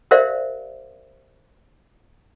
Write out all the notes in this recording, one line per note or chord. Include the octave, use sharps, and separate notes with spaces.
G4 A#4 C5 D5 E5 F5